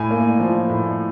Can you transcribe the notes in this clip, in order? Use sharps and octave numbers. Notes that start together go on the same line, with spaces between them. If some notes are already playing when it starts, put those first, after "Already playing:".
Already playing: A2 G#5
A#3
F3
A2